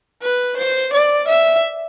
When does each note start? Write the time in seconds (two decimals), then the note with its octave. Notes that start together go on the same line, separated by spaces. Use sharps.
0.22 B4
0.57 C5
0.93 D5
1.28 E5